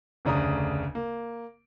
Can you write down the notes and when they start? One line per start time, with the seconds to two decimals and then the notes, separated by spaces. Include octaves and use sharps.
0.25 F1 D2 C#3 D4 A#5 D#6
0.95 A#3